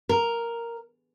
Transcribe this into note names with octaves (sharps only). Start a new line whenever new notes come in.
A#4